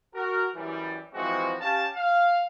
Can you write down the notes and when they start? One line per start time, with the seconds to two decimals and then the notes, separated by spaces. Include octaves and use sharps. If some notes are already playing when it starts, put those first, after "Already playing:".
0.14 F#4 A#4
0.55 F#2 E3 G3
1.13 E3 F3 G#3 C4 F#4
1.60 C#4 G4 F5 A5
1.95 F5